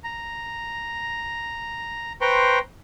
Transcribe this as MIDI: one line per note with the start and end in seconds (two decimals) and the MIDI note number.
0.04 2.13 82
2.21 2.59 71
2.21 2.59 72
2.21 2.59 79
2.21 2.59 82
2.21 2.59 84
2.21 2.59 85